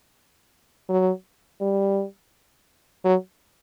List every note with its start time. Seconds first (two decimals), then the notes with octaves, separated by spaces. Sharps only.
0.89 F#3
1.61 G3
3.04 F#3